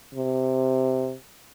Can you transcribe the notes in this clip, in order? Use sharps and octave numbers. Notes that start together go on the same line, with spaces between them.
C3